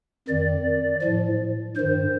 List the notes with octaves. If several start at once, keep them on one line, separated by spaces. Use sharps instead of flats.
F2 D#3 D5
A2 F3
G2 D#3 C5